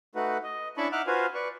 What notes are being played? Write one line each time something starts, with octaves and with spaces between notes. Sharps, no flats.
A3 D#4 F#4 B4 F#5
D#5
C#4 D4 E4 A5 B5 C#6
D#4 E5 F#5 D6 F6 F#6
F4 F#4 B4 C5 F5 G#5
B4 D5 C#6